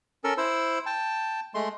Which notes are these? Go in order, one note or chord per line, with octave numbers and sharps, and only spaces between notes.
C#4 A4 A#4 E6
E4 C5 E6
G5 A5
G#3 A3 C6